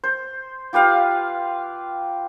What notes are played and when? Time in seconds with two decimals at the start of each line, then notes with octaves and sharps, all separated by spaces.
0.04 C5
0.73 F4 G4 B4 F5